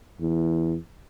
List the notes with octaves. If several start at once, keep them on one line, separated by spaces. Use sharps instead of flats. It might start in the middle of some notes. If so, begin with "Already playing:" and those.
E2